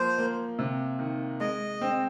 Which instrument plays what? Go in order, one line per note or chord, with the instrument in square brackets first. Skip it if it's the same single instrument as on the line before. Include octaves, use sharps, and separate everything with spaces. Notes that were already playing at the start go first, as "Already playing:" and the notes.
Already playing: [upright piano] F3 A#3 [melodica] C5
[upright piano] A#3
C3
D#3
[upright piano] G#3 [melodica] D#5
[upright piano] C4